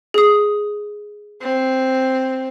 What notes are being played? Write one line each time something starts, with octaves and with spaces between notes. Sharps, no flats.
G#4 D#6
C4